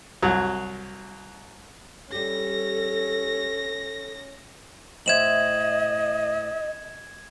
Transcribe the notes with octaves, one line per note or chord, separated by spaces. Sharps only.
C2 F#3
G3 C#4 G4 A4 A#6
A2 C5 D#5 E5 G#6 E7 F#7